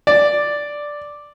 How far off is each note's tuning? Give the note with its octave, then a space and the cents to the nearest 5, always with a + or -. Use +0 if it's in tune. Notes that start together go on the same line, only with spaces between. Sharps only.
D5 +0